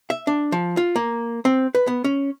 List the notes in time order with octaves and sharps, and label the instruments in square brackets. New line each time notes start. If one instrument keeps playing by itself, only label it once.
[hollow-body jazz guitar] E5
D4
F3
F4
A#3
C4
B4
B3
C#4